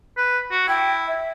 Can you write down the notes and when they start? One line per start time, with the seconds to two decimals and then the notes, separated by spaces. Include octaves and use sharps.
0.17 B4
0.51 F#4
0.68 E4 G5
1.07 E5